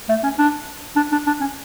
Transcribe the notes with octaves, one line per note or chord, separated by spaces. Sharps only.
A3
C#4
D4
D4
D4
D4
C#4